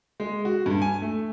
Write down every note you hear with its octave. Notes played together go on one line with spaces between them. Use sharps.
G#3
F#4
G2
G#5
A3